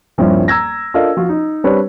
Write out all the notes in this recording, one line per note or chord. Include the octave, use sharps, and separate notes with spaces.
D#1 G2 F3 C4 C#4 E4
A#5 E6 G#6 A#6
D4 F4 A4 A#4 D#5 F5
F3 F4 F#4
D#4
G3 C4 D4 B4 C#5